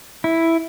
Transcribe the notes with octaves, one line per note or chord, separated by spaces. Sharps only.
E4